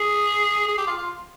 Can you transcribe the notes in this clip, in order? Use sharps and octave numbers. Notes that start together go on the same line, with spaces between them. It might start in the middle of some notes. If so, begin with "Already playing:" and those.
Already playing: G#4
G#4
G4
F4
F4